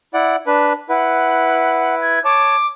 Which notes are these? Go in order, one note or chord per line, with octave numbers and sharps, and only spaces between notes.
E4 D5 F#5
D4 B4
E4 B4 F#5
G#6
C#5 A5 D6